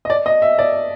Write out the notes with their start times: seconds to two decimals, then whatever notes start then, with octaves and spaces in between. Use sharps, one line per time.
0.05 D#5
0.10 D5
0.26 D#5
0.42 E5
0.59 D5